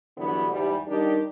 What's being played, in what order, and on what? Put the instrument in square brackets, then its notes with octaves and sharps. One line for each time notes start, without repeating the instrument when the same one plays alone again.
[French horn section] G2 D3 E3 F#3 B3
E2 G#2 G3
D#3 G3 D4 D#4 G4